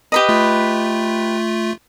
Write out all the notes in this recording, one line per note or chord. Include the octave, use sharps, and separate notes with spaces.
G4 B4 D#5
A3 F4